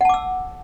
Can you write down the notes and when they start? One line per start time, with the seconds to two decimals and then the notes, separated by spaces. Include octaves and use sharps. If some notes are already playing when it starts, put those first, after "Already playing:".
0.01 F#5
0.05 A5
0.09 D6
0.14 E6